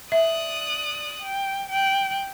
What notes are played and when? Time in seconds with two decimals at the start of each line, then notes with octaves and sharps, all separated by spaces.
0.12 D5 E5 D#6 F#6
1.22 G5
1.70 G5 F#6